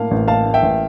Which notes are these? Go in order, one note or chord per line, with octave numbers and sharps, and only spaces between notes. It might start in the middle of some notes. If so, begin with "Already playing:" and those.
Already playing: A2 A#3 F5 A5
A1
A#3 F5 A5
A2
E5 G5
A1